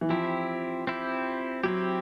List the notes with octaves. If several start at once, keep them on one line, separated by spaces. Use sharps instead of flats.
E3
F3 C4 E4 G4
C4 E4 G4
F#3 C4 E4 G4